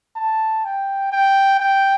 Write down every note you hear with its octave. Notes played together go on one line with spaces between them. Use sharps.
A5
G5
G5
G5